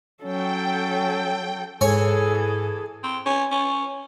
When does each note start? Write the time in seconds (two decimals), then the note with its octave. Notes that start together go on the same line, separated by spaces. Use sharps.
0.24 F#3 C#4 A4 G5
1.81 G#2 E3 G#4 A4 C#5 G#5
3.03 C4
3.26 C#4
3.52 C#4